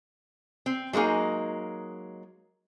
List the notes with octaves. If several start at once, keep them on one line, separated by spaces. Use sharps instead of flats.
C4
F#3 G#3 A#3 D#4 G#5